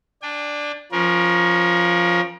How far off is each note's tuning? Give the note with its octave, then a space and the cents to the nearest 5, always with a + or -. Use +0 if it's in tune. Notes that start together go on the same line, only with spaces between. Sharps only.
D4 +0 G5 +45
F3 +0 C#4 +0 A#4 +25